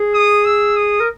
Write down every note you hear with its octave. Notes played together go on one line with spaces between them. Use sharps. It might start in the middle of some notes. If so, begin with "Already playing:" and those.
Already playing: G#4
D#6
E6
D#6
A#4